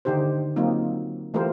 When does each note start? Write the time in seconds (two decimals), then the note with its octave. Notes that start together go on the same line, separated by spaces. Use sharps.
0.05 D3 D#3 D#4 G4 C5
0.56 F#3 A#3 C4 D#4 F4
1.34 E3 A3 F4 G4 A#4 C5